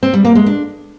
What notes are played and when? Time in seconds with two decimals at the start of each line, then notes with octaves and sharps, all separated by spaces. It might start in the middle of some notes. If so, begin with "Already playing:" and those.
0.03 C4
0.14 G3
0.25 A#3
0.35 G#3
0.46 D4